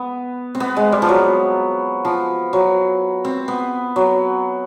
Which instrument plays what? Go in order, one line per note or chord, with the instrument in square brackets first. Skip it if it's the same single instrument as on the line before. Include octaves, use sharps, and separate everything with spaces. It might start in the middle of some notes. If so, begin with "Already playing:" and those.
Already playing: [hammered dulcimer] B3
C4
B3
G#3
G3
F3
F#3
F3
F#3
C4
B3
F#3